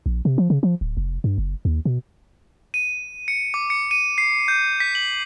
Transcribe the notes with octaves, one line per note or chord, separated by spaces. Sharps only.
A#1
C3
F3
C#3
F3
D1
F1
G2
F#1
D#2
B2
D#7
C#7
D6
C#7
D#7
C7
G6
B6
F#7